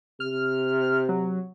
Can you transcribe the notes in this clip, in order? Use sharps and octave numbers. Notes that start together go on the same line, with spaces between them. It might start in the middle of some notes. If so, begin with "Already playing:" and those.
C3 F6
F#3